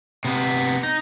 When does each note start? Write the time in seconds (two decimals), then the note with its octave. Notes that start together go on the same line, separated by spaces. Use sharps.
0.25 C3 B3
0.83 D#4